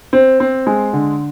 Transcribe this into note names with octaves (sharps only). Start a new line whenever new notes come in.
C4
C4
G#3
D3